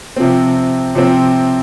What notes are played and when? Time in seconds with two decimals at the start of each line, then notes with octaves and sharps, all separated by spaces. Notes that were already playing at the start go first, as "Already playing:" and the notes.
0.16 C3 F3 C4
0.95 C3 F3 C4